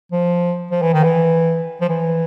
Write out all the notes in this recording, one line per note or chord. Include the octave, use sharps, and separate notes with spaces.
F3
F3
E3
D#3
E3
F3
E3